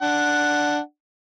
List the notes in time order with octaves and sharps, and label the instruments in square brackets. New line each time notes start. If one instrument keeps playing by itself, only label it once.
[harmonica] D4 F#5